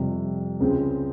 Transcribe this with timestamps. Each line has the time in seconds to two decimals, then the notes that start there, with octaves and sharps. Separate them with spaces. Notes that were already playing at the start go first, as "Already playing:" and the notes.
Already playing: F2 C3 G3
0.60 C#2 C#3 G#3 C4